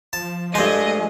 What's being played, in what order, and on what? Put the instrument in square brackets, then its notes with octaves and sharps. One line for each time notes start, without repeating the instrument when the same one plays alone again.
[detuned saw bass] F3 [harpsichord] A5
[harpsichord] G2 C5 [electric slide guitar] G#3 [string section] A3 D#5